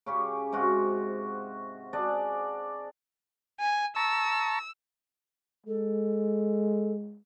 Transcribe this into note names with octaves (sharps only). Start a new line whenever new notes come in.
C#3 C#4 G4
G#2 C3 F4 F#4
D4 G#4 D5 D#5
G#5
A5 A#5 C#6 E6
G#3 A4